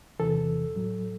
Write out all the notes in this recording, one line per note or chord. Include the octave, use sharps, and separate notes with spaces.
E2 C3 E3 A4
A2 F#3